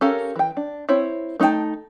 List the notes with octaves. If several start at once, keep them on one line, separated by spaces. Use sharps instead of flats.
C#4 G4 A4 A#4 F5
E3 G5
D4
C4 E4 C#5
A3 D#4 E4 G5 A5